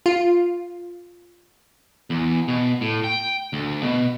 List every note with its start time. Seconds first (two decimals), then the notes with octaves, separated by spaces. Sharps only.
0.06 F4
2.10 E2
2.48 B2
2.81 A2
3.04 G5
3.53 D2
3.83 B2